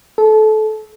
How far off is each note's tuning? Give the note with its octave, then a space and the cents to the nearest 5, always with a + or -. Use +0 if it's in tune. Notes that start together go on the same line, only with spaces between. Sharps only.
A4 -25